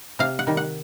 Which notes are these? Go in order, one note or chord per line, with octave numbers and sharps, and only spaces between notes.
C3 F5
F#5
D#3 G3
F#5